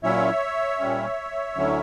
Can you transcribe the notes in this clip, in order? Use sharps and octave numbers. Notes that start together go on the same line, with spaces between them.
A#2 F#3 C#4 E4 C#5 E5
A#2 G3 C#4
D2 D3 F#3 C#4 E4